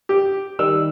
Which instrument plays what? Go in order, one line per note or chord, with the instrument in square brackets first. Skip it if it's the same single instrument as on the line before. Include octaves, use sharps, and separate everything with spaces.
[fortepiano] G4
[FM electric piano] D#3 G3 [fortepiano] E6